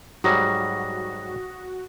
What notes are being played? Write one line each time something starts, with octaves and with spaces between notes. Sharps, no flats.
G#2 F#3 G3 F#4 D#6 A#6